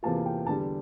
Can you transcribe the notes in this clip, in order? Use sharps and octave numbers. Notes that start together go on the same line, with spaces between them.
E2 C3 E3 A#3 F4 A5
G5
E2 D3 G3 A5